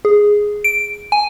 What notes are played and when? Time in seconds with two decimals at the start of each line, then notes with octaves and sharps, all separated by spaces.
0.05 G#4
0.64 D7
1.12 G#5